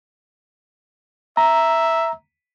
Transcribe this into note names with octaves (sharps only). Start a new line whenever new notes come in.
E5 A#5